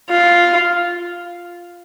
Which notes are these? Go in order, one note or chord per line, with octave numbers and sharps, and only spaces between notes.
F4